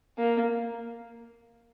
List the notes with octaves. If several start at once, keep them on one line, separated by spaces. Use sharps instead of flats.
A#3